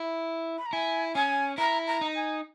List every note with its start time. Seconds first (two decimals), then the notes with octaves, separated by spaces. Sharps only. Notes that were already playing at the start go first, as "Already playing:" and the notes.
Already playing: E4
0.58 B5
0.66 A#5
0.73 E4 G#5
1.15 C#4 G#5
1.58 E4 A#5
1.87 A#5
2.01 D#4
2.16 G#5